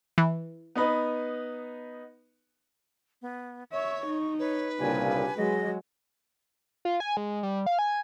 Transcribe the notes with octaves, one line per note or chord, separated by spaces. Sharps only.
E3
B3 D#4 B4
B3
C#5 E5 C#6
D#4
B4 C#5
C2 A#2 C#3 D4 G4 G#5
F#3 G#3 D#5
F4
G#5
G#3
G3
F5
G#5